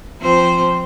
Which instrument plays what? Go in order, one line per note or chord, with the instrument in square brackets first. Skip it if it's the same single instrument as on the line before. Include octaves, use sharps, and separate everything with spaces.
[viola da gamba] F3 C4 C5